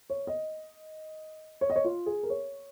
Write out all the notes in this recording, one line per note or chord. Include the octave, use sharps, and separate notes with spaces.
C#5
D#5
C#5
D#5
C#5
F4
G#4
A#4
C#5